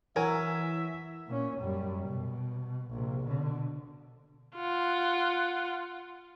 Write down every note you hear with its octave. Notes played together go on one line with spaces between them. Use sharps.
E3 F#3 A#4 E5 G#5
A#2 C#4
F#2 G3
B2
A#1 C3
B2 D3
F4 F#5